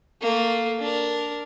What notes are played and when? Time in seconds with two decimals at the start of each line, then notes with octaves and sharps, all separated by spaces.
0.21 A3 A#3
0.80 D4 A#4